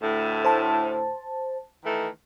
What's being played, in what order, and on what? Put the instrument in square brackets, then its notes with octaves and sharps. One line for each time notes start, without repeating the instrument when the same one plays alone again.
[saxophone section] D2 A2
[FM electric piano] C5 A5
[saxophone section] D#3 E3 A3